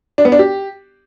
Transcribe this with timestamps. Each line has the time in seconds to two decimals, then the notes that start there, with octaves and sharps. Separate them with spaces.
0.18 D4
0.25 B3
0.32 D4
0.39 G4